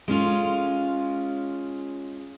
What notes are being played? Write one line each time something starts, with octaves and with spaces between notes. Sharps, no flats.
G#3 C#4 F4